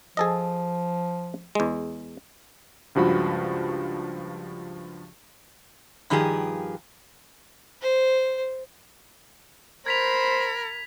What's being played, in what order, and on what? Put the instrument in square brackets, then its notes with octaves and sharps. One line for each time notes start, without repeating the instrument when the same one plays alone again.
[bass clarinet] F3 [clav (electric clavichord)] G#4 A4 D#5
[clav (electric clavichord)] E2 G#3
[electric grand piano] C#2 G2 F3 F#4 B5
[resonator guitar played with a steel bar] G2 D#3 F3 G4 G#4
[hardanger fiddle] C5
[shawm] A#4 [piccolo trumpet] C5 [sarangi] B5 [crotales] G#6 B6 F7